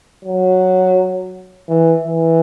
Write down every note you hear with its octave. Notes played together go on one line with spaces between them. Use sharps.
F#3
E3
E3